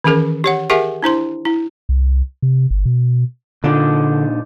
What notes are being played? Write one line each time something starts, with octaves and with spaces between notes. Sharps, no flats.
D#3 E3 C#4 G#4 A#4
G4 C#5 F#5
G4 G#4 A#4 E5 F#5 G#5
D4 E4 C5 C6
E4
C2
C3
G1
B2
A#2 D3 D4 D#4